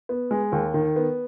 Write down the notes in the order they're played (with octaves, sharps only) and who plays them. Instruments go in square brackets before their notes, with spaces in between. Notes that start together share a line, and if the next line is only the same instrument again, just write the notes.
[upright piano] B3
G#3
D#2
D#3
B3